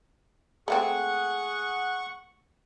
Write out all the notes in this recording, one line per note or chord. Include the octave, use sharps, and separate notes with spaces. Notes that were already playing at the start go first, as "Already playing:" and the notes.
A3 A#3 C4 G#4 F#5 C#6